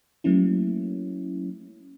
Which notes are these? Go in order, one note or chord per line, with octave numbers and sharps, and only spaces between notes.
F#3 A3 A#3 C#4 E4